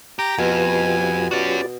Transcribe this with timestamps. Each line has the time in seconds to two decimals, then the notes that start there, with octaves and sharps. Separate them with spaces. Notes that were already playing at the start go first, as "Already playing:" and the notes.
0.19 G4 G5 A#5
0.38 F2 B2 F4 G4 B4 G#5
1.31 C#4 F#4 D5